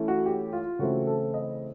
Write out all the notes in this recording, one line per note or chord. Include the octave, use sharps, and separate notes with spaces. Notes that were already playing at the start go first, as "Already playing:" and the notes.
Already playing: E3 A3 C#4 E4
F#4
G4
F4
C#3 E3 A3 C4 E4 F#4
A4
D#5